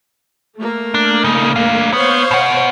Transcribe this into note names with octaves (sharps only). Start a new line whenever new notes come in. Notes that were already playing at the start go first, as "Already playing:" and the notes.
A3 A#3
D4
C#3 D#4
D4 F5
B3 C5 C#5 F5
B2 F#5